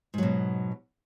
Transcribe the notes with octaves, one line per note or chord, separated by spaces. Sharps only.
G#2 B2 F#3